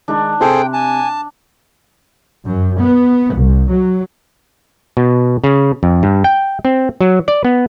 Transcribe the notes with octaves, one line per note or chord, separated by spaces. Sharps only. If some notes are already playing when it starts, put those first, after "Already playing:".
D#3 G#3 D4 D#4
C3 C4 G#4 A4 C5 G5
G#5 A5
F#2
B3
C2
F#3
B2
C#3
F2
G2
G5
C4
F#3
D5
B3